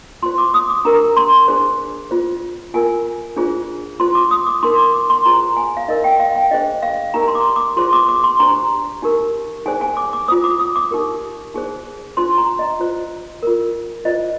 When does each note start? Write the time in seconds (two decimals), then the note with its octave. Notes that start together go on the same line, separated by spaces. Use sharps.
0.22 F4 C6
0.26 C5
0.38 D6
0.54 D#6
0.70 D6
0.85 D4 G4 A#4 A#5
1.17 C6
1.48 D4 G#4 C5
2.11 F4 C5
2.74 F4 A#4 G#5
3.36 D4 F4 G#4 C5
4.00 F4 C5 C6
4.15 D6
4.31 D#6
4.47 D6
4.63 D#4 A#4 C6
4.78 D6
4.94 D6
5.10 C6
5.25 F4 G#4 C5 A#5
5.56 G#5
5.77 F5
5.88 D#4 A#4 D#5
6.04 G5
6.20 F5
6.36 G5
6.51 D4 G#4 C5 D#5
6.83 F5
7.14 D#4 G4 A#4 A#5
7.28 C6
7.35 D6
7.56 D6
7.76 F4 G#4 C5 C6
7.93 D6
8.09 D6
8.24 C6
8.40 D4 G4 C5 A#5
9.02 D#4 G4 A#4
9.66 D#4 G#4 C5 G#5
9.81 G#5
9.97 D6
10.13 D6
10.28 F4 C5 D#6
10.44 D6
10.59 D#6
10.76 D6
10.91 D#4 G4 A#4
11.54 D#4 G#4 C5
12.17 D4 F4 C5 C6
12.38 A#5
12.59 D#5
12.80 F4 C5
13.43 F4 A#4
14.05 F4 C5 D#5